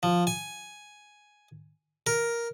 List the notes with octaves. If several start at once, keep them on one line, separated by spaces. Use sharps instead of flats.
F3
G#5
A#4